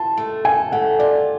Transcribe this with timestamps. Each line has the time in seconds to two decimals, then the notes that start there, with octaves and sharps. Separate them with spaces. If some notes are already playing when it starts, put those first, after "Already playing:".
Already playing: F4 A5
0.17 A3
0.45 A4 G#5
0.72 A3 F#5
0.99 F4 D5